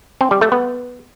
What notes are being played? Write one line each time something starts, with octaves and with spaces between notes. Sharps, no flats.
C4
G3
A3
B3